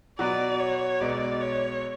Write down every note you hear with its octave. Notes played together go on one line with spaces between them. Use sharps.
B2 F#3 B3 F#4 B4 D5
C#5
B1 B2 G#3 B3 D5
C#5